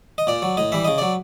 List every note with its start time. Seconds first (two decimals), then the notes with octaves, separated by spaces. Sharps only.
0.18 D#5
0.27 A#2 D5
0.42 F#3
0.57 A2 D#5
0.72 E3 G3 E5
0.85 C#3 D#5
0.98 F#3 D5